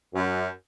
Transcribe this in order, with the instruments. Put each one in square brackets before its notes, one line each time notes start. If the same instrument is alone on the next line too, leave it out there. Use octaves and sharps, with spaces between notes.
[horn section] F#2